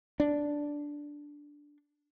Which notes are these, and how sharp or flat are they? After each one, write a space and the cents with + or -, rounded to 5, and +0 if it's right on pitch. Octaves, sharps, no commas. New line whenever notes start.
D4 -5